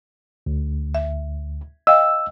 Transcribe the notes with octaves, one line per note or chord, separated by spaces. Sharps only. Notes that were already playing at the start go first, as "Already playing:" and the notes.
D2
E5
D#5 F5 G5 E6